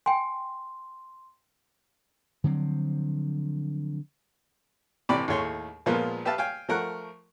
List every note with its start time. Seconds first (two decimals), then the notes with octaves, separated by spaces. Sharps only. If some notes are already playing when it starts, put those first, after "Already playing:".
0.06 G5 G#5 C6
2.44 D3 F3 F#3 C4
5.09 A1 C3 E3 G4 D5 B5
5.28 D#2 A2 A3 G#4 C#5 C6
5.86 A#2 F3 G#3 A#3 B3
6.25 G4 B4 E5 F5 A5
6.38 F5 G5 G#5
6.69 F3 A3 A#4 F#5 C#6 F#6